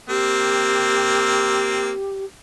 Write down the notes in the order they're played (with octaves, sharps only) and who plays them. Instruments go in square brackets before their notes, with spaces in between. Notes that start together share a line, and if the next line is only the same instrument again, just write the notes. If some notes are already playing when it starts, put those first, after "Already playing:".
[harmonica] A#3 C4 [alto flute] G4